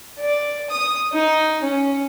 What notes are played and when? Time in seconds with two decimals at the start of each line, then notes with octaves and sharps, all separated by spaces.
0.19 D5
0.70 D#6
1.13 D#4
1.63 C#4